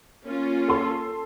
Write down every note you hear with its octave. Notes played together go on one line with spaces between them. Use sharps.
A#3 C#4 F4
A4 C6